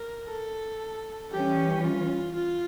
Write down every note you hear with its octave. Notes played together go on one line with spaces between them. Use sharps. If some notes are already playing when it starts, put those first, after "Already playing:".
Already playing: A#4
A4
E3 G3 C#4 G4
F4
F4